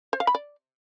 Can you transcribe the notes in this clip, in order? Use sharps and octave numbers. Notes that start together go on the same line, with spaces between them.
C5
F5
B5
D5